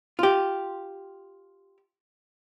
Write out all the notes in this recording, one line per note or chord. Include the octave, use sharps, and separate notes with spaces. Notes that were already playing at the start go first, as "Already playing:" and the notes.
F4 G4